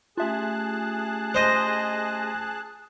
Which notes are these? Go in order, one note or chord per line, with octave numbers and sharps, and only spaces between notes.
A3 C#4 F4 G4 G#4 E5 A5 F#6
C5 D#5